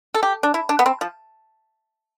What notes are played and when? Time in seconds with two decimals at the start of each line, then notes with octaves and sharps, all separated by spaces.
0.14 A4
0.23 G4
0.43 D4
0.54 E4
0.69 D4
0.79 B3
0.86 C4
1.01 F3